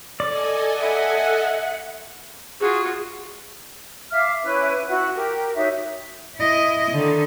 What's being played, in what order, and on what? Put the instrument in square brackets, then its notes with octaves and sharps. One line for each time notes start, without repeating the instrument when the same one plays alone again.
[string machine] A4 D#5 G#5 [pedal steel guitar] D5
[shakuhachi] E5 [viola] F#5
[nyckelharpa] F4 F#4 [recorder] G#4
[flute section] E5 F5 D6 F6
C#4 E4 B4
E4 F#4 F#5
G4 A#4
D#4 F#4 C#5 E5
[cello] E4 D#5
D3 D#3